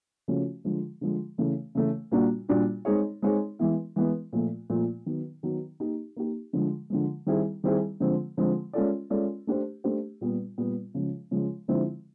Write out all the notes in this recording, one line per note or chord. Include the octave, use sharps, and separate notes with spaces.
C#3 F3 A3 C#4 F#4
D3 F3 G#3
D3 F3 G#3
C#3 E3 A3
C#3 E3 A3
A#2 G3 A#3 D4 F#4
A#2 G3 A#3 D4 F#4
G#3 C4 D#4 G#4 C#5
G#3 C4 D#4 G#4 C#5
E3 G#3 B3 E4
E3 G#3 B3 E4
A#2 F3 A3
A#2 F3 A3
D#3 F#3 B3
D#3 F#3 B3
A#3 D#4 G4
A#3 D#4 G4
D3 F3 G#3
D3 F3 G#3
D#3 G3 C4 E4 G#4
D#3 G3 C4 E4 G#4
D3 F3 G#3 C4
D3 F3 G#3 C4
G#3 C#4 F4 A4 D5
G#3 C#4 F4 A4 D5
A3 D4 G4 C5
A3 D4 G4 C5
A#2 G3 B3
A#2 G3 B3
C#3 F3 G#3
C#3 F3 G#3
D3 F3 G#3 C4 E4